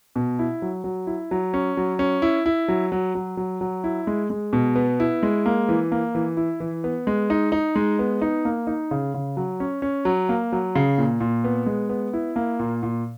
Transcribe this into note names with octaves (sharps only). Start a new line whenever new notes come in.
B2
E4
F#3
F#3
E4
F#3
C#4
F#3
C#4
E4
E4
F#3
F#3
F#3
F#3
F#3
E4
G#3
G#3
B2
B3
E4
G#3
A#3
E3
A#3
E3
E4
E3
B3
G#3
D#4
D#4
G#3
B3
D#4
A#3
D#4
C#3
C#3
F#3
C#4
C#4
F#3
A#3
F#3
C#3
A#2
A#2
B3
G#3
B3
E4
A#3
A#2
A#2